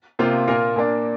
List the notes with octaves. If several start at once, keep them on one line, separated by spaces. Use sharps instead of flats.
C3 A#3 F4 C5 F5
A#2 A#3 F4 A#4 F5
A#2 A#3 D4